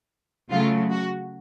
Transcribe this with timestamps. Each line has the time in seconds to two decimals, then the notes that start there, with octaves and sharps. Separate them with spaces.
0.50 C#3 F#3 A3 F4
0.91 F#4